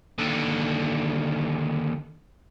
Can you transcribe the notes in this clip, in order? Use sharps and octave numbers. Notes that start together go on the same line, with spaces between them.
D#2 D3